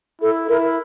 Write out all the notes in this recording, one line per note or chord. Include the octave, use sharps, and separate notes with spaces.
E4 A4
E4 A#4